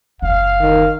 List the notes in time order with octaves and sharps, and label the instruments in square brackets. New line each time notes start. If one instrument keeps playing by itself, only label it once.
[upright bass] F#1 E2 [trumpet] F5
[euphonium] D#3